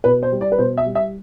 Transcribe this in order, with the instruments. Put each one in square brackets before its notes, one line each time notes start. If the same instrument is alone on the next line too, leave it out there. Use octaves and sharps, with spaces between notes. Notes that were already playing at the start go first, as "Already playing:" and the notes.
[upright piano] B2 B4
C5
G3
D5
B4
B2 C5
E5
G3
E5